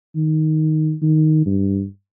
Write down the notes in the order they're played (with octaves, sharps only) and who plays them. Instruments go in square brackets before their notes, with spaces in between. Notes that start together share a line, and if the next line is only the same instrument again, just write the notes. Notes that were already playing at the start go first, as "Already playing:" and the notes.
[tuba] D#3
D#3
G2